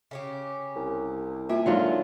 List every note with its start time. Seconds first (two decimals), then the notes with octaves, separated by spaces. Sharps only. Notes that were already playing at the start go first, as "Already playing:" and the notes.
0.11 C#3 C#4 G4
0.76 C2
1.49 A#3 F4 E5 G#5 A5
1.66 D3 F#3 G#3 D#4 F4 F5